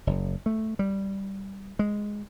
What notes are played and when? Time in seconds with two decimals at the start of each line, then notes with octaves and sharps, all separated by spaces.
0.07 F#1
0.46 A3
0.79 G3
1.79 G#3